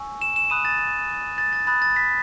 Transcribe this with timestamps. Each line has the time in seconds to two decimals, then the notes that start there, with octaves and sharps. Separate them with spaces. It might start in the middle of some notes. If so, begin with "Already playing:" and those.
Already playing: G#5 C#6 E6
0.21 E7
0.36 E7
0.50 B5 D#6 F#6 D#7
0.65 A6
1.38 A6
1.53 A6
1.67 B5 D#6 F#6 A6
1.82 A6
1.96 B6